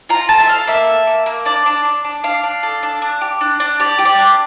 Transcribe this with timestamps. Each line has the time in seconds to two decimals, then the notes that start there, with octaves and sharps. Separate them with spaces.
0.09 F4 A#5
0.29 A4 A5
0.39 E5
0.49 A4 F5
0.67 A#3 E5
0.87 A4
1.07 A#3
1.26 A#3
1.45 D4 D5
1.66 D4
1.85 D4
2.05 D4
2.24 D4 F5
2.43 D4
2.63 A4
2.83 D4
3.02 D4
3.21 G4
3.41 D4
3.60 D4
3.80 G4 D5
3.99 G4
4.05 D5
4.19 D4